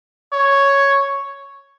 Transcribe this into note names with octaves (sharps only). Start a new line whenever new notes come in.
C#5